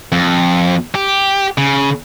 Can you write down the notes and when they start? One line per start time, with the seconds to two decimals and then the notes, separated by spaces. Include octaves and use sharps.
0.12 F2
0.95 G4
1.58 C#3